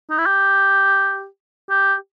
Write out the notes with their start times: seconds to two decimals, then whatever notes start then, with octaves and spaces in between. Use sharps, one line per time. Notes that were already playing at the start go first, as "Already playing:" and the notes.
0.10 D#4
0.18 E4
0.26 G4
1.70 G4